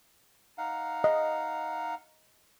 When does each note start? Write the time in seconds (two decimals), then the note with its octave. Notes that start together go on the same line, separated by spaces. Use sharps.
0.58 D#4 F5 F#5
1.04 D#5